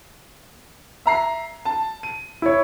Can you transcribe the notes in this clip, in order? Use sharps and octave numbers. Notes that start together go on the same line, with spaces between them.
E5 A#5 C7
A5
D#7
E4 C#5